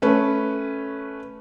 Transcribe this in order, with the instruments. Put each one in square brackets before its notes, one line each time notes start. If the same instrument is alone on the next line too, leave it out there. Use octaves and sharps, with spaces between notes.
[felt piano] A3 C#4 B4